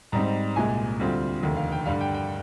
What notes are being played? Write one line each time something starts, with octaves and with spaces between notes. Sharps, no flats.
G#2 G3 C4 D#4 A#5
C2 A#2 G#3 G#5
D2 D3 G3 C4 F4
F1 D#2 D3
F5
G5
G2 D3 G3 F5
G5
G5